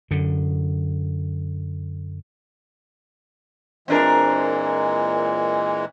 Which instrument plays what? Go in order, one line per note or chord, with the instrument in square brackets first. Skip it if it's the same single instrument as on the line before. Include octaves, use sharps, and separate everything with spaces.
[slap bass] F#2 D3
[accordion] A#2 E3 G#3 [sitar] C4 D4 A#4